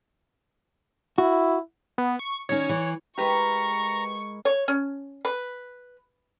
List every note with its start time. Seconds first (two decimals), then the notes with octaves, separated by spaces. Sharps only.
1.18 E4 F#4
1.98 B3
2.19 C#6
2.49 D#3 C#4 C#5
2.69 E3
3.18 G#3 E4 G4 A#4 B4 A#5 C#6
4.45 C#5
4.68 C#4
5.25 B4